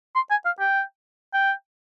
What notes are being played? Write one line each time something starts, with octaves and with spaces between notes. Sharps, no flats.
C6
G#5
F5
G5
G5